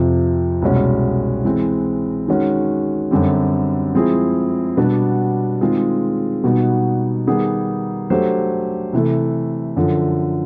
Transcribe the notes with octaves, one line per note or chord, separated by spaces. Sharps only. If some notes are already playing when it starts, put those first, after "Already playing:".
Already playing: F2 C3 F3
C2 B2 G#3 C#4 F#4
E3 G#3 C4
D#3 G#3 C#4 F#4
F#2 D3 G3 C4
F3 G#3 C4 E4 G#4
B2 G3 B3 D4 F#4
D#3 G#3 C4 F4 G#4
B2 G3 B3 D#4 F#4
D#3 G3 B3 D#4 G#4
F#3 A3 D4 G4 C5
C3 E3 A3
F#2 D3 F3